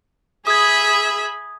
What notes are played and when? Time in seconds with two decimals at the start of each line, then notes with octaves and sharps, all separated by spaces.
0.47 G#4 E5 B5 D#6 G#6